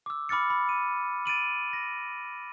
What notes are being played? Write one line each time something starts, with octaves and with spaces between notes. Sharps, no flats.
D6 E6
B5 D6 F6 A6 C#7
B5
D#7
A6 D7 D#7 F#7
A#6